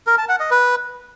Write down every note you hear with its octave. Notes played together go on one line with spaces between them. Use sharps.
A#4
A5
F#5
D#5
B4